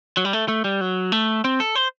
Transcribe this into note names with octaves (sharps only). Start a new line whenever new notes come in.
F#3
G3
A3
A3
G3
F#3
A3
C4
A4
C5